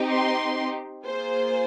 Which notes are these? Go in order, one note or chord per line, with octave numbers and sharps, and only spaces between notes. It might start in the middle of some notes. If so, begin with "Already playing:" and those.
Already playing: C4 D#4 G4
C6
A#3 F4 G#4 C5